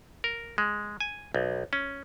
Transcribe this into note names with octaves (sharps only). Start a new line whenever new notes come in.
A#4
G#3
G#5
B1
C#4